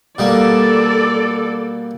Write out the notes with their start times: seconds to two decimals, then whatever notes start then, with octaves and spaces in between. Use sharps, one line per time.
0.18 B2 G3 A#3 A4 D5